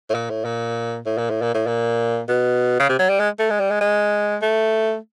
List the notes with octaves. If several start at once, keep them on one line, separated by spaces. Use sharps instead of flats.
A2
A#2
A2
A#2
A2
A#2
A2
A#2
A2
A#2
B2
C#3
C3
F#3
G3
G#3
A3
G#3
G3
G#3
G#3
A3